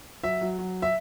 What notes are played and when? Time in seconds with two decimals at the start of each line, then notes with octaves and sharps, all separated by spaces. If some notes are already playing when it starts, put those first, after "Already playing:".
0.23 F#3 E5
0.41 F#3
0.59 F#3
0.82 E5